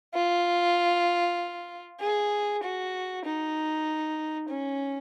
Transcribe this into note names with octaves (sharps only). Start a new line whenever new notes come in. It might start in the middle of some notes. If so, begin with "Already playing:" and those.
F4
G#4
F#4
D#4
C#4